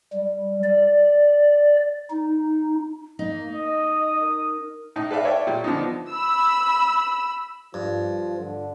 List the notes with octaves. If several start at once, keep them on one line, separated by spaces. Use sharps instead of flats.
G3
D5
D#4
A#3 D#4
D#5 D#6
A#4
A2 D#4
A4 B4 D5 E5 F5
C#5 D5 E5 G5
A#2 G3
D3 F3 B3 D4 D#4
B5 E6
G2 F3
D3